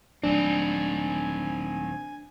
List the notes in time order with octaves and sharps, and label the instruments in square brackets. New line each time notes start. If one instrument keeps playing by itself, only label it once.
[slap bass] D#1 F#3 A3 [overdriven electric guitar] C4 D#4 [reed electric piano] D4 [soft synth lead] G#5